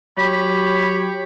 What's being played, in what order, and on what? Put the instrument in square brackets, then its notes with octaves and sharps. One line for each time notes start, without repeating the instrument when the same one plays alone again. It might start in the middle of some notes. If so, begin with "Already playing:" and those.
[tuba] F#3 [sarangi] G4 [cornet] C#5 [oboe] B5